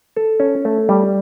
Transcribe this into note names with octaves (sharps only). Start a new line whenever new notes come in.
A4
C#4
A3
G3